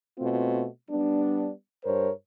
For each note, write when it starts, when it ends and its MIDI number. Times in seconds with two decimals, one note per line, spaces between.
0.19 0.65 47
0.19 0.65 57
0.19 0.65 60
0.19 0.65 65
0.88 1.49 55
0.88 1.49 59
0.88 1.49 62
1.84 2.09 43
1.84 2.09 70
1.84 2.09 72
1.84 2.09 73